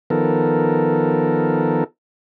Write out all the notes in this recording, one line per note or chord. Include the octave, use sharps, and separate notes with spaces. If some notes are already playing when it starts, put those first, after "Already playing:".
D#3 F3 B3 A4 A#4